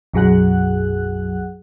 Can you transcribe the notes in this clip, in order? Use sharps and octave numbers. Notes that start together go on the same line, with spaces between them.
B1 F#2 F#3 G#4 F#5 F#6